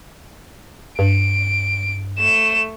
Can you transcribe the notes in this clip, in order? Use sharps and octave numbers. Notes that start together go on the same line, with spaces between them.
G2 D7
A3 E7